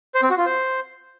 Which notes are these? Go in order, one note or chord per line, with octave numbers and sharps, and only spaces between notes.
C5
C4
F#4
F4
C5